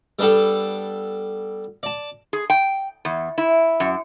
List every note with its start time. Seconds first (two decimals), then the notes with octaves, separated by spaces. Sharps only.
0.19 G3 B3 D4 G4 A4
1.83 D5 A5
2.33 G#4
2.50 G5
3.05 E2
3.38 E4
3.80 F#2